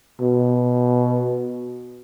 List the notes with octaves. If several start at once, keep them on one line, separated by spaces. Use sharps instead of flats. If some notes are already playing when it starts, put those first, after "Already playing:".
B2